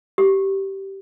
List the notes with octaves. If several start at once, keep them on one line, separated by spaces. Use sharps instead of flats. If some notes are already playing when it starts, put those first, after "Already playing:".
G4